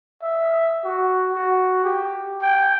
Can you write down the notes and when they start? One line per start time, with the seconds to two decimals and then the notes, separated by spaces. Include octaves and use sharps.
0.22 E5
0.84 F#4
1.33 F#4
1.84 G4
2.41 G5